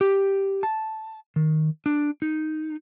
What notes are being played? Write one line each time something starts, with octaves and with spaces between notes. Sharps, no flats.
G4
A5
D#3
D4
D#4